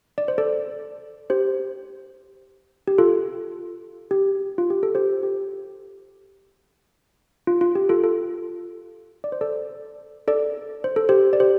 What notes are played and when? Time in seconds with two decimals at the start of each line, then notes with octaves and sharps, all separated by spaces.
0.18 D5
0.28 C5
0.38 A4 D5
1.30 G4 C5
2.88 G4
2.98 F4 A4
4.11 G4
4.58 F4
4.70 G4
4.83 A4
4.95 G4 C5
5.23 G4
7.47 F4
7.61 F4
7.75 G4
7.89 F4 A4
8.04 F4 A4
9.24 D5
9.32 C5
9.41 A4 D5
10.28 A4 D5
10.84 C5
10.96 A4
11.09 G4 C5
11.33 D5
11.40 G4 C5